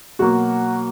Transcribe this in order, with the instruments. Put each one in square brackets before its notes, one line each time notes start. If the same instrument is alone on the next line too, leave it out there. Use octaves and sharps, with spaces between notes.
[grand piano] B2 F#3 A#3 F#4